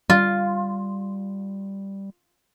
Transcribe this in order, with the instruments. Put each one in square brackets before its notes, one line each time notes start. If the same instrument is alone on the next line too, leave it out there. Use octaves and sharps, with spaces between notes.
[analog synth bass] G3 [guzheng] F4